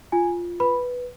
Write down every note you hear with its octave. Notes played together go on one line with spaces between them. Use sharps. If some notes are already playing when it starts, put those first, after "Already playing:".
F4 G#5
B4 B5